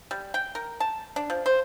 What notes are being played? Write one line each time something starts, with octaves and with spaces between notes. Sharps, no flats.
G3
G5
A#4
A5
D4
F3
C5